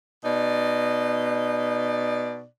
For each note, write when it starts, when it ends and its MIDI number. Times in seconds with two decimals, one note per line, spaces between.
0.25 2.43 47
0.25 2.43 63
0.25 2.43 74